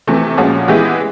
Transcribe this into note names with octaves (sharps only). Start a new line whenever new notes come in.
C3 E3 A3
A#2 F3 G#3 C#4 F#4
E3 G#3 B3 E4 G4